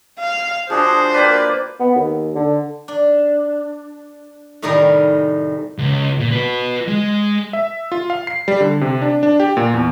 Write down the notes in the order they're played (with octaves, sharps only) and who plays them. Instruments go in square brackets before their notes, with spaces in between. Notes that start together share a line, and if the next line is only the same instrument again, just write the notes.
[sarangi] F5
[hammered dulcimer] F3 D4 F#4 [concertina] G#4 [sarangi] C5
[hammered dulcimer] A#3 G4 B4 [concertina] D5
[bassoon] B3
D#2
D3
[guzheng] D4
A2 C3 D#3 G3 G#4 A#4
[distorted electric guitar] C#2
A#2
F#4 B4
G#3
[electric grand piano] E5
F4
F5
C7
G3
D3
C3
D4
D4
G4
A#2
E2